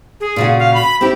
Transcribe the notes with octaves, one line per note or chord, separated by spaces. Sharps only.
G#4
A#2 C#3 F#4
F5
B5
C4 E4 G4